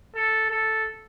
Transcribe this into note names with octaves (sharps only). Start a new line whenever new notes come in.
A4
A4